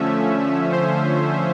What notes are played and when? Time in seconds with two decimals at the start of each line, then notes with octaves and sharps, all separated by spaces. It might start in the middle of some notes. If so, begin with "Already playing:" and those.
Already playing: D3 F3 A3 C#4 E5
0.72 C5